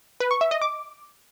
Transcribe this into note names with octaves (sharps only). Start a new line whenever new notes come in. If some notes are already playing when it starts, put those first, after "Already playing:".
B4
C#6
E5
D#5
D6